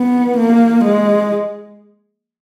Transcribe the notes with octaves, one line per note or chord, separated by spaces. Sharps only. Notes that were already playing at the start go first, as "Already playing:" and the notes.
Already playing: B3
A#3
G#3